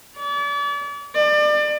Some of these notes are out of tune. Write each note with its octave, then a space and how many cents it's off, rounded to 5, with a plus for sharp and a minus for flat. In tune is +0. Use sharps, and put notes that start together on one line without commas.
D5 -40
D5 +30